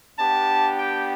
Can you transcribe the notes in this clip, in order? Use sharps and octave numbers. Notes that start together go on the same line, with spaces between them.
B3 D4 G4 A5
G5